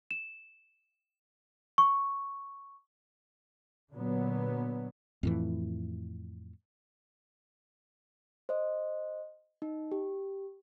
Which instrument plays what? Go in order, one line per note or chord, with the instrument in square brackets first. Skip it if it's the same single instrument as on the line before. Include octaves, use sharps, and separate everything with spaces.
[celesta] E7
C#6
[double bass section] A#2 D3 F#3 B3
[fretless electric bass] F2 A2 E3
[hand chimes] C5 D#5
D#4
G4